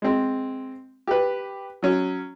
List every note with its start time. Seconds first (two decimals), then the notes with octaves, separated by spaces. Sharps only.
0.02 G#3 C4
1.07 G4 B4
1.82 F#3 C#4